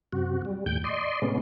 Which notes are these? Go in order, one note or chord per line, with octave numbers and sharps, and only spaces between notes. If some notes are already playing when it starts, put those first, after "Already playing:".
F#2 C3 F#4
G3
D#2 A2 G5 G6
D5 D#5 C6
A2 C3 G#3 B3 C#4